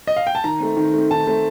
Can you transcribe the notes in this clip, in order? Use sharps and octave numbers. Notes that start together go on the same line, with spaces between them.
D#5
F5
G5
A5
D#3 A#5
A3 C4
D#3
A3 C4
D#3 A5
A3 C4